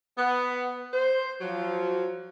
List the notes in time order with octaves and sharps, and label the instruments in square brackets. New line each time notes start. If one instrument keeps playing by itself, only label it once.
[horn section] B3
C5
F3 F#3